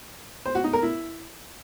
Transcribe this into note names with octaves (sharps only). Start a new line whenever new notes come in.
C5
F#4
D#4
A#4
E4